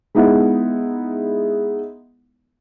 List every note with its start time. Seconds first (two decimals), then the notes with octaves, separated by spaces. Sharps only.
0.15 G#3 B3 D#4 E4 F#5